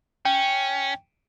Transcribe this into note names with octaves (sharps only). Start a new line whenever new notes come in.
C#4 G5